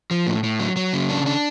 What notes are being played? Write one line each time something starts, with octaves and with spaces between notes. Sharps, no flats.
F3
A2
A2
F#3
F#3
C#3
D4
D4